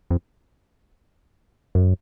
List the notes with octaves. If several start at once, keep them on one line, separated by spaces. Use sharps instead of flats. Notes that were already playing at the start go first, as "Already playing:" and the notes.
F2
F#2